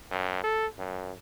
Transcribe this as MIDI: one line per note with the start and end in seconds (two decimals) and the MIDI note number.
0.11 0.42 42
0.44 0.66 69
0.78 1.12 42